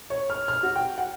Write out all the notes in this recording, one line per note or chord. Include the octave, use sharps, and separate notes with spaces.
C#5
F6
F6
F#4
G5
F#5